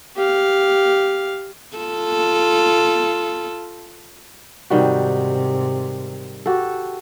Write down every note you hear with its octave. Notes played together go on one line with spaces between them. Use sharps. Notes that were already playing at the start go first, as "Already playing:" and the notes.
G4 F5
F4 A4
G#2 C3 D#3 G3 F#4
F#4 G4 A4